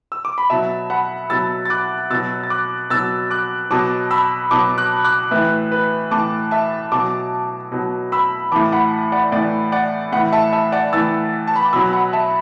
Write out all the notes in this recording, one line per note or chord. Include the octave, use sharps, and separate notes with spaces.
E6
D6
B5
B2 F#3 E5 A5
F#5 B5
B2 F#3 E6 A6
A6
D6 F#6
B2 F#3 E6 A6
A6
D6 F#6
B2 F#3 E6 A6
D6 F#6
B2 F#3 A5 D6
B5 E6
B2 F#3 A5 D6
D6 F#6
D6 F#6
A2 E3 B4 E5
B4
A2 E3 A5 D6
E5 A5
B2 F#3 A5 D6
B2 F#3
B5 E6
A2 E3 A5 D6
F#5 B5
D5 F#5
A2 E3 D5
D5 F#5
A2 E3 F#5 B5
E5 A5
E5 A5
D5 F#5
A2 E3 E6 A6
A5
B5
D6
B2 F#3 B5 E6
F#5 B5
E5 A5